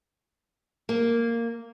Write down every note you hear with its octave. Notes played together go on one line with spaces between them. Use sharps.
A#3